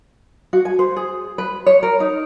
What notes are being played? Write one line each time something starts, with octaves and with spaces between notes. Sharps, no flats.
F#4
G#5
C5
G#4
B4
C#5
A#4
D#4